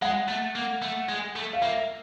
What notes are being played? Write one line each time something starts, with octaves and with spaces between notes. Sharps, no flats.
G#3 F#5
A3
A#3
A3
G#3
A3
F5
A#3 E5